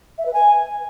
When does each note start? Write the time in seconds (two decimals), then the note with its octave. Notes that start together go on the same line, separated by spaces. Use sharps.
0.18 E5
0.26 B4
0.33 G#5